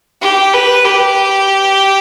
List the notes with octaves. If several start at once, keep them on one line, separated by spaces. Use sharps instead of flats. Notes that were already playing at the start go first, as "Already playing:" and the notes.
G4
B4
G4